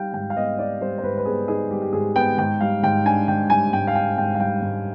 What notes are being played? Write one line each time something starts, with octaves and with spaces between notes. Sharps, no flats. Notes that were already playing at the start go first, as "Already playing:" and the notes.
Already playing: G3 D#4 F5 G5
G#2 G5
F5
B3 D#5
D#4 D5
G3 C5
C5
G#2 B4
B4
B3 G#4
D#4 G#4
G3 G4
G4
G#2 G#4
B3 G5
G#2 G5
G3 F5
G#2 G5
D4 G#5
G#2 G5
G3 G#5
G#2 G5
F5
D4 G5
G#2 G5
F5
G3 G5
G#2